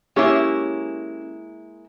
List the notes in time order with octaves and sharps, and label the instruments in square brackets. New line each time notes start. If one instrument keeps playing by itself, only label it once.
[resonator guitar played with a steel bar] G#3 A#3 E4 [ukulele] C#4 G4 C#5